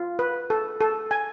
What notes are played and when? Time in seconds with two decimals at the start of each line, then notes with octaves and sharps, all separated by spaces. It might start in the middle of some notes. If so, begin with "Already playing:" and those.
Already playing: F4
0.19 B4
0.50 A4
0.81 A4
1.11 G#5